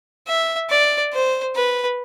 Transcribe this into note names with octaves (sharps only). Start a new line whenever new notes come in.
E5
D5
C5
B4